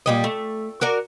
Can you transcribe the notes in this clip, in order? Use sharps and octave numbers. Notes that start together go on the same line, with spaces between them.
A#2 G3 D#5
A3
F#4 A#4 D5